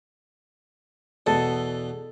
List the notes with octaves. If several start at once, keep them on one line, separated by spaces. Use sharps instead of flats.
E2 B2 A4